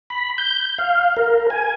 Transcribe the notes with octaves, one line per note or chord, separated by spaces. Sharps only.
B5
G6
F5
A#4
G#5